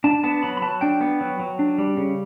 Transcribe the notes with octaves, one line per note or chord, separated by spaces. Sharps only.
D4 A5
B3 A5
F#3 B5
B5
F#3 A5
D4 G5
B3
F#3
F#3
D4
G3
C#3